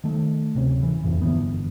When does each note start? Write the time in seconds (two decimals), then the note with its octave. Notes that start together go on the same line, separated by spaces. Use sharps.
0.04 D#3 A3
0.55 D1 C3 C#4
0.83 E3
1.04 G1 F2 A2
1.21 G1 D3 E3 B3